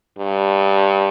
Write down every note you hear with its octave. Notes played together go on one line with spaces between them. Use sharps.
G2